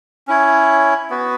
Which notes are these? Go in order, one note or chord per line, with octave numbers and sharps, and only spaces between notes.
C#4 E4 C#5
B3 F#4 B4